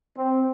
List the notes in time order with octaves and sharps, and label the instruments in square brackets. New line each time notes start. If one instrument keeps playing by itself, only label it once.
[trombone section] C4